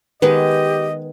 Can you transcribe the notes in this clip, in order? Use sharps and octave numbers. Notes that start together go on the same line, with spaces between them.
D#3 G#3 B3 G4 B4 D#5